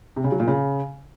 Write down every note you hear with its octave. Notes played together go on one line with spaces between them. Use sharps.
C3
C#3
F#3
A#2
C#3